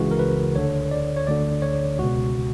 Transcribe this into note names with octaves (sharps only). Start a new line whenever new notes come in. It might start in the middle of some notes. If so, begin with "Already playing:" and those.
Already playing: C#2 C#3 E3 F#4
A#4
B4
D2 D3 C#5
D5
C#5
D2 D3 D5
C#5
C#2 B2 F#4